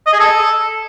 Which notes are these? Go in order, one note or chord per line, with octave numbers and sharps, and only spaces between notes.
D#5
G#4
A4